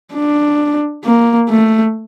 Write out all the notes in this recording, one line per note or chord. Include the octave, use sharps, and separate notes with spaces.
D4
A#3
A3